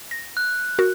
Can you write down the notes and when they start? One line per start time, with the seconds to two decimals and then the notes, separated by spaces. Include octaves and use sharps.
0.11 A#6
0.37 F#6
0.79 F#4 A#4